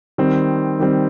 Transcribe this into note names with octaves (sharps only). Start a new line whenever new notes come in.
D#3 G3 C4
D#3 G3 C4